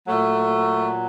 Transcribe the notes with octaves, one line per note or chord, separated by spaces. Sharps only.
A#2 F#3 A3